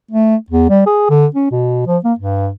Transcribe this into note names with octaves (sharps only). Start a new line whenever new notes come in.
A3
E2
G3
G#4
D3
C#4
B2
F3
A#3
G2